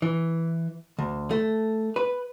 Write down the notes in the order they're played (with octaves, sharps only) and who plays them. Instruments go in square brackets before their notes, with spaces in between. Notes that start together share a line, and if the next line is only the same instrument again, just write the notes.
[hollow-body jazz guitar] E3
D2
A3
B4